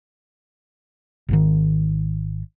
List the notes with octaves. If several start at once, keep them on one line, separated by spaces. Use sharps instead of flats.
G#1 G#2 D#3